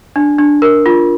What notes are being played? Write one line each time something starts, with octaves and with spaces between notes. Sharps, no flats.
D4
D4
A#4
F4